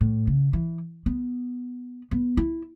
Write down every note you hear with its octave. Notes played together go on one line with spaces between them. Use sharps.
A2
C#3
E3
B3
B3
E4